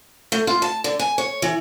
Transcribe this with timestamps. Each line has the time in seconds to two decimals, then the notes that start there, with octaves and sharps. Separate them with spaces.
0.32 A3
0.47 F4
0.62 A5
0.84 D3
0.99 G#5
1.18 C#5
1.42 E3